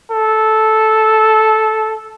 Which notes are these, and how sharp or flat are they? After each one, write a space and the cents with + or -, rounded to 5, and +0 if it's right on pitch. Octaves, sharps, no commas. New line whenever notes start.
A4 -10